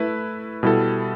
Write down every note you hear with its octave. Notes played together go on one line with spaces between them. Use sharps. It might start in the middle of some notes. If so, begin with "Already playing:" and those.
Already playing: A3 E4 B4 E5
B2 G3 E4 A4